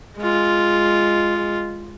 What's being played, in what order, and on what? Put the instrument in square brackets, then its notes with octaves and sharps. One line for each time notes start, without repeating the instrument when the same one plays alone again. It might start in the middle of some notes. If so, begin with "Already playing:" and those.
[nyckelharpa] G#3 F4